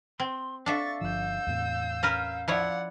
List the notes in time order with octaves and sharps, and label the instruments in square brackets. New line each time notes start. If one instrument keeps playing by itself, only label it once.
[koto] C4 [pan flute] C6
[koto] D4 A4 E5 [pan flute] F5 [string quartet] C#6 A6
[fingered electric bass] G1 F3 [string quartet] E6 G6
[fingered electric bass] E2 A2 C4
[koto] C#4 A#4 B4
[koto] F3 E4 C#5 [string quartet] D5 F#5